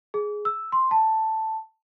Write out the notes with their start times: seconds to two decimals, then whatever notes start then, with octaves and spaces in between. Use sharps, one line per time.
0.14 G#4
0.45 E6
0.72 C6
0.91 A5